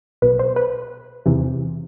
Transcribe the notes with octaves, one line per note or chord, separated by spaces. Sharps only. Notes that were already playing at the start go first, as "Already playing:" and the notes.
B1 B2 B4
C5
B4
E2 C3 E3